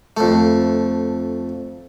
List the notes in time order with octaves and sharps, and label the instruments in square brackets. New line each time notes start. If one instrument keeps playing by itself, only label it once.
[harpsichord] F2 A3